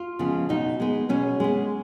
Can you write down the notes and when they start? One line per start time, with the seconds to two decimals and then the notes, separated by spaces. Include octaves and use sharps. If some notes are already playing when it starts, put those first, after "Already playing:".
Already playing: F4
0.19 C#3 F3 G#3 B3
0.49 B2 D#4
0.80 G#3 B3
1.09 B2 C#4
1.40 G#3 B3